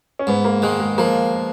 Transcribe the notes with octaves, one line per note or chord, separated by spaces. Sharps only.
C#4
G#2 B3
A#3
D#3 G#3
G#3
F3 A#3